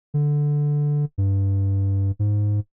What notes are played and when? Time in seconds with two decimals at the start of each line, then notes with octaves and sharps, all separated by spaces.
0.14 D3
1.18 G2
2.19 G#2